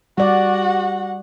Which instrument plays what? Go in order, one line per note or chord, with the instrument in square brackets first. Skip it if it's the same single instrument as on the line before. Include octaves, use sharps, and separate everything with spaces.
[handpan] G3 D5 [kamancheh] F#4 F#5